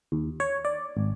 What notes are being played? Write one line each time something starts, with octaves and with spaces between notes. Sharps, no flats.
D#2
C#5
D5
G#1